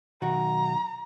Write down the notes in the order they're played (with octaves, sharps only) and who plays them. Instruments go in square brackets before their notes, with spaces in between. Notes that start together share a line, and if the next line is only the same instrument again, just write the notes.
[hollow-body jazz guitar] B1 D#3 F#4 [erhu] A#5